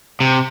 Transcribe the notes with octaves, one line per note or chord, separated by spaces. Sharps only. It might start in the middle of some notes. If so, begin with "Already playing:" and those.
C3